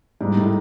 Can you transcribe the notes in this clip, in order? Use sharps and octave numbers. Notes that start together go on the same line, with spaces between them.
G#2 G3
A2 D#4